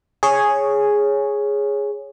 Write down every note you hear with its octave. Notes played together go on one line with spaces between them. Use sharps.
G#4 C#5